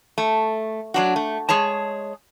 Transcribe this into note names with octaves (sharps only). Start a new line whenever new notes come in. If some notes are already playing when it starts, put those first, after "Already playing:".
A3
F#3 D4 F#4
A3
G#3 G#4 C#5 A5